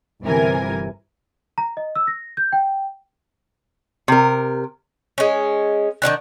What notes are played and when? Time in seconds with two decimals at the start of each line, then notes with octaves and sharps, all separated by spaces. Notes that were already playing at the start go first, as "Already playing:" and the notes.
0.22 G1 C3 E3 A#4 G#5
1.58 A#5
1.77 D#5
1.96 E6
2.07 A#6
2.37 G6
2.52 G5
4.08 C3 A#4
5.18 G#3 C#4
6.02 D#3 C#4 D4 F#5